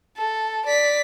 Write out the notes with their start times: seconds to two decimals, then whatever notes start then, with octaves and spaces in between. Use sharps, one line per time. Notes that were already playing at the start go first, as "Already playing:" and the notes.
0.17 A4
0.66 D5 B6